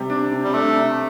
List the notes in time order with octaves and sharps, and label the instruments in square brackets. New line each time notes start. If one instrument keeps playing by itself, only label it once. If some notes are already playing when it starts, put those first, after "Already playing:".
Already playing: [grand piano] C3 G3
D4
C3
[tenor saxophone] G3
[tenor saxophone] A3 [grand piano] D4
[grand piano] C3